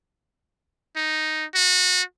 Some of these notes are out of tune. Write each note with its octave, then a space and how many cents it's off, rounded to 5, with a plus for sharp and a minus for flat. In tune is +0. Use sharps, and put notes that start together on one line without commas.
D#4 +0
F#4 -25